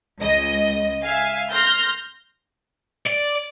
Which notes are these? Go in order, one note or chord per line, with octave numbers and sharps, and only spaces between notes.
C#2 D#5
E5 F5 G#5
C6 F6 G6 A#6
D5